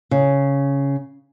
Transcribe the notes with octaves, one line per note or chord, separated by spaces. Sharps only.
C#3